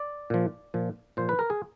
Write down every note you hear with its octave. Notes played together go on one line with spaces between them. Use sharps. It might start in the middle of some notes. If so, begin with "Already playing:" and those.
Already playing: D5
A#2 F3
A#2 F3
A#2 F3 C5
B4
A#4
G#4